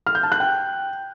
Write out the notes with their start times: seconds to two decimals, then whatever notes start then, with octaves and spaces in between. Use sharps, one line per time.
0.07 F6
0.15 G6
0.23 A5
0.32 F#6
0.40 G5